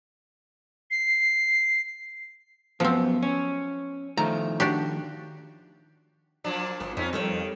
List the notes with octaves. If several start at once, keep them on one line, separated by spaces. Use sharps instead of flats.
C7
F#2 F3 B3 C4
C#4
D#3 F3 A3 A#5
D4 F#4 G4
A#2 F3 F#3 D4
G#1 B3
F2 C4 C#4 D#4
D#3 G3 A4 C#5